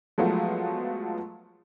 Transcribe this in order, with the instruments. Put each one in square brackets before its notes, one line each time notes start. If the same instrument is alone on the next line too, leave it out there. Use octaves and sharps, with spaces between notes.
[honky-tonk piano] F3 F#3 G#3 A3 B3 F4